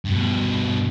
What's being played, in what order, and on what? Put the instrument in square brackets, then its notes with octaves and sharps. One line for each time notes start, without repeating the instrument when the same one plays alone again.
[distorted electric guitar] G2 B2